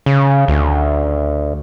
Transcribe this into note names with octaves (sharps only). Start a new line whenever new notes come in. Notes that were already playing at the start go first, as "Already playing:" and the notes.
C#3
D2